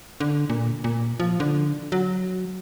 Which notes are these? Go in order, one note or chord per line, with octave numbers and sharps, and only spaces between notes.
D3
A#2
A#2
F3
D3
F#3